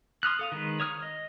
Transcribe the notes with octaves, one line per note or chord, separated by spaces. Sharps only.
C6 D#6 F6 F#6
A4 F5 D#6
D#3 G#3 B4
C#5 D#6 F6
D#5